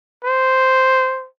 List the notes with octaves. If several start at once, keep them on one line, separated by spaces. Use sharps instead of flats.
C5